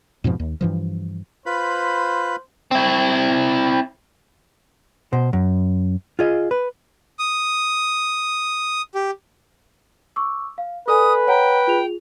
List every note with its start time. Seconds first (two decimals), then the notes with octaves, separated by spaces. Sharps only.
0.24 F2 G#2 B2 F3
0.40 D#2
0.61 G2 E3 F3
1.46 F4 B4 C5 B5
2.71 C4 E4
5.13 B2 C5
5.33 F#2
6.19 F4 G#4 D#5
6.51 B4
7.19 D#6
8.95 G4
10.16 C#6 D6 E6
10.58 F5
10.88 A4 B4 D5 G#5 D#6
11.27 C#5 F#5 G5 A#5
11.67 F4 G#4 F7